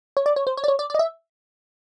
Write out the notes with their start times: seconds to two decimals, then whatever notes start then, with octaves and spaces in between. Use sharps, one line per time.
0.17 C#5
0.26 D5
0.36 C#5
0.47 C5
0.57 C#5
0.64 D5
0.68 C#5
0.79 D5
0.90 D5
0.95 D#5
0.99 E5